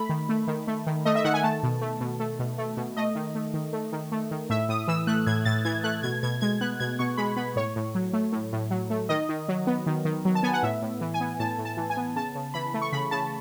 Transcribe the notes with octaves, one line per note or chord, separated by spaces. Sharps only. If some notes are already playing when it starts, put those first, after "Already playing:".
Already playing: A3 B5
D#3
A3
D#3
A3
D#3
A3 D#5
E5
D#3 F#5
G#5
A3 A5
B2
A3
B2
A3
B2
A3
B2
A3 D#5
D#3
A3
D#3
A3
D#3
A3
D#3
A2 E5
A2 D#6
E3 E6
A3 F#6
A2 G#6
A2 A6
E3 G#6
A3 F#6
B2 G#6
B2 G#6
G#3 G#6
B3 F#6
B2 G#6
B2 C#6
G#3 B5
B3 B5
A2 C#5
A2
F#3
A3
A2
A2
F#3
A3
D#3 D#5
D#3
F#3
B3
D#3
D#3
F#3
A5
B3 G#5
F#5
A2 E5
A2
E3
G#5
B3
A2 A5
A2
A5
E3
G#5
B3
C#3 A5
C#3
E3 B5
A3
C#6
C#3 B5
C#3 A5